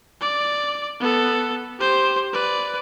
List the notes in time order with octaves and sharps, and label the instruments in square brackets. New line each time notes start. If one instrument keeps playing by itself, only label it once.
[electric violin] D5
B3 A4
G4 C5
B4 D5